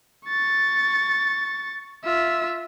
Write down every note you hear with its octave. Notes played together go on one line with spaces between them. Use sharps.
C#6 A6
F4 E5